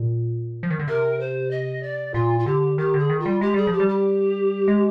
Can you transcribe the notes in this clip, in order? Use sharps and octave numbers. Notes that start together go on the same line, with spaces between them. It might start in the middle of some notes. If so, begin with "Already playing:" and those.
Already playing: A#2
F3
D#3
D3
C3 A#4
C5
D#5
D5
A#2 F4
F4
D3 G4
D#3 G4
D3 G#4
D#3
F4
G3
G#3 G4
G3 G#4
F3
G4
G3
G4
G#3